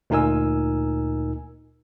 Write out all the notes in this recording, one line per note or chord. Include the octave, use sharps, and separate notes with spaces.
D2 A#2 D#4 A#4 G#5 E6